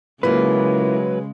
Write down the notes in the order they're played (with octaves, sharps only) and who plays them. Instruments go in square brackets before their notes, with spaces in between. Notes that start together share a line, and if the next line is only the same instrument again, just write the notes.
[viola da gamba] C#3 G#3 [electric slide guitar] F#3 B4 [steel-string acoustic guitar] A#3 E4 F4